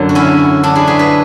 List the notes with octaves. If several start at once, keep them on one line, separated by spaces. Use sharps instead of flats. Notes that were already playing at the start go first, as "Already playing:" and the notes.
Already playing: F#2 D3 F#3
F#4
C#4 E4
D4 F#4
E4 G#4
G#4 B4
G#4 B4